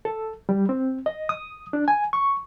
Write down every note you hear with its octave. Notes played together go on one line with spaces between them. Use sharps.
A4
G3
C4
D#5
D#6
D4
G#5
C#6